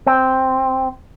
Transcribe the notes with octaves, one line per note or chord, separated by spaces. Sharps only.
C4